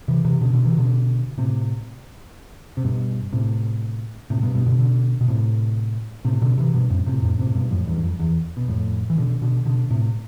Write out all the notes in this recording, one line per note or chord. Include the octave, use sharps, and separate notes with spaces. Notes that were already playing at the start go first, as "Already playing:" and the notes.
C3 E3
C3 E3
B2 D3
B2 D3
C3 E3
B2 D3
A2 C3
C3
G2 B2
A2 C3
A2 C3
G2 B2
G2 B2
B2 D3
B2 D3
B2
A2 C3
A2 C3
B2 D3
C3 E3
G2 B2
F2 A2
A2 C3
F2 A2
A2 C3
G2 B2
F2 A2
E2 G2
F2
E2
B2
F2 A2
E3
B2 D3
B2 D3
B2 D3
A2 C3